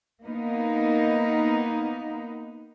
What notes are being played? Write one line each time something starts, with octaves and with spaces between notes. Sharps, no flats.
A#3 B3 D#4